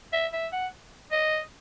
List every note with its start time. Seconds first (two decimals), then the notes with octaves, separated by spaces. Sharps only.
0.13 E5
0.33 E5
0.53 F#5
1.12 D#5